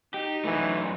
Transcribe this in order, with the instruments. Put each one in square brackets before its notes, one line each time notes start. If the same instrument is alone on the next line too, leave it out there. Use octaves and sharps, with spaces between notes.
[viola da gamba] D#4 [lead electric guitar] G4
[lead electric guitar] F#2 A3 [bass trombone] E3